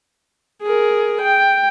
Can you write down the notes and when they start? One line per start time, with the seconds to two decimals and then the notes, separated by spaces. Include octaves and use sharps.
0.63 G#4 A#4
1.22 G5